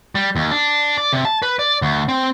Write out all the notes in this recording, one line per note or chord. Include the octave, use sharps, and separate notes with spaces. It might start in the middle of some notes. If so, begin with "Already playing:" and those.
G3
D#2
D4
D5
C3
A5
B4
D5
D2
C4